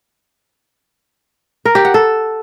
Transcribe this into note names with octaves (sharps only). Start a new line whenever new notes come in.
A#4
G4
F#5
A4